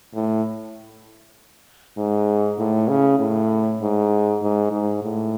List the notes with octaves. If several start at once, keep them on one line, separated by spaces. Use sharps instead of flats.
A2
G#2
A2
C#3
A2
G#2
G#2
G#2
A2